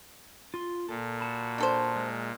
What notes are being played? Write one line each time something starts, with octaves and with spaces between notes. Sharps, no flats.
F4 C6
A#2 A4
F#4 A5 B5
D4 A4 C5
G#3